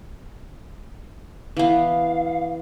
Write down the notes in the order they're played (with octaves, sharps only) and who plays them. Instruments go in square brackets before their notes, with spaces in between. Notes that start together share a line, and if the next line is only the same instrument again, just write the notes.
[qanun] E3 B3 [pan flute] F5